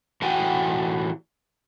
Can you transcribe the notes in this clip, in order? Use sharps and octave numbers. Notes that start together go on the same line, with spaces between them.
A2 E3 F#4 G5 G#5